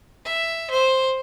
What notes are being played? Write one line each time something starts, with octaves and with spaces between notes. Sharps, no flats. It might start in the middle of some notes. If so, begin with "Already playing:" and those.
E5
C5